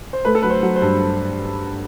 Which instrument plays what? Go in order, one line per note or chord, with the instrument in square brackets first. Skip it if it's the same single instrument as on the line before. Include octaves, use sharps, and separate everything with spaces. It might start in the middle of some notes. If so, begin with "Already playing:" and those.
[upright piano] C5
[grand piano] A3 [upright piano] B4
[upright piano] A4
[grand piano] F#3 [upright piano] B4
[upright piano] C5
[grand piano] F#3
[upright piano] C5
[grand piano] G2